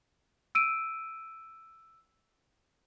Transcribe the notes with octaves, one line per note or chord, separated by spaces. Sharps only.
E6 D7 D#7